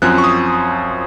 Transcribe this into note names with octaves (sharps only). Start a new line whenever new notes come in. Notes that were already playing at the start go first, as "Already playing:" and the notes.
F#2 F3 C4 F#6
C#6
D#6